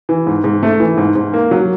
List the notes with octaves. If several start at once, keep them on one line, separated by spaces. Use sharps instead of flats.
E3
G#2
G#2
A3
E3
G#2
G#2
A#3
F#3